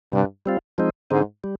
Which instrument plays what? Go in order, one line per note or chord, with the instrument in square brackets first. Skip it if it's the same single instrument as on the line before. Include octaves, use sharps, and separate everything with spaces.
[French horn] G2 [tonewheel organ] C3 G3 D4
[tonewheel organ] G3 C4 F4
F3 G#3 C4 D#4
[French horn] G#2 [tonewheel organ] D3 G#3 C4 D#4
[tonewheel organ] G3